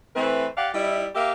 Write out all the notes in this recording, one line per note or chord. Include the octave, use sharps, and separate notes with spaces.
E3 A3 C4 B4
G4 D5 F5 F#5
G3 D#4 E4
A#3 G4 E5 F5